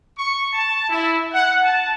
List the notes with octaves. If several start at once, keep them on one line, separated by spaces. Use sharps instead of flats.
C#6
A5
E4
F#5
A5